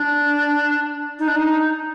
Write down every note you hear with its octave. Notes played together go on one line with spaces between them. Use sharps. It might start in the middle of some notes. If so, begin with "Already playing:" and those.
Already playing: D4
D#4
D4
D#4